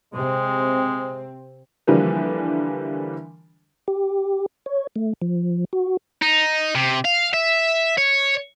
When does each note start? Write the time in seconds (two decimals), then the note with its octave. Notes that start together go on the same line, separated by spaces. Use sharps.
0.14 C3 G#3 C4
1.87 D3 E3 F3 G3 A#3
3.88 G4
4.66 C#5
4.96 A3
5.22 F3
5.73 F#4
6.22 D#4
6.75 C3
7.05 F5
7.34 E5
7.97 C#5